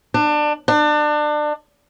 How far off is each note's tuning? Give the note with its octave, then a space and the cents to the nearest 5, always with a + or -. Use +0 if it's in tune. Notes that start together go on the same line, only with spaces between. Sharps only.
D4 +25
D4 +30